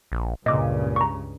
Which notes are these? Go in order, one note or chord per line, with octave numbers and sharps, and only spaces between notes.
A#1
C#2 G2 A#2 C#3 D#5 D6
A#5 C#6